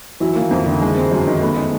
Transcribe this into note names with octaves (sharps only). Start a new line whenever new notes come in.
E3 F#3
D#3 A#3
F2 E3
D3
G#3
C4
F#2 F#3
D#3 G#3
A3 B3
G#3 D#4